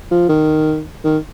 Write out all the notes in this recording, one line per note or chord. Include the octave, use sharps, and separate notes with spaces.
F3
D#3
D#3